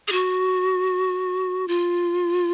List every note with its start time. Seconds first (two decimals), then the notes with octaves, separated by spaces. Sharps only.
0.08 G#4
0.12 F#4
1.68 F4